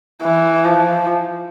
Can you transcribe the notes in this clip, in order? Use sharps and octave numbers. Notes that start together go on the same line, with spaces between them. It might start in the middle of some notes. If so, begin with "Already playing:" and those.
E3
F3